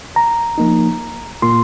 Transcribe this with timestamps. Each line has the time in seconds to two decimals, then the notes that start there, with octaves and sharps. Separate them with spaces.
0.16 A#5
0.58 F3 A#3 D#4
1.42 A#2 A#3 F4 C6